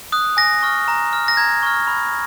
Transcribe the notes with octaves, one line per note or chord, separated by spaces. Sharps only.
D#6 F#6
G#5 A#6
C#6 F6
A#5
F6
A#6
A#5 G#6
C#6 F6
B5